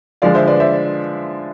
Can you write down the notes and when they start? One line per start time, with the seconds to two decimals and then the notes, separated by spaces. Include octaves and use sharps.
0.22 D3 F3 G#3 D5 F5
0.35 C5 E5
0.47 B4 D5
0.60 C5 E5